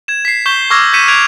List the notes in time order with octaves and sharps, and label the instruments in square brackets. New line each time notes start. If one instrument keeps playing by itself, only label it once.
[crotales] G#6 E7
B6 C7
C#6 G6 B6 E7 G7
C#6 D6 E6 F6 G#6 A#6
G6 G#6 B6 C#7 D#7 E7
F#6 G#6 D7 F7